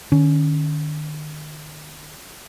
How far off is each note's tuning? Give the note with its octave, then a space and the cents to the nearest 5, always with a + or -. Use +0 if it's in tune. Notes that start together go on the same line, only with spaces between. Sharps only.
D#3 -40 C#4 +15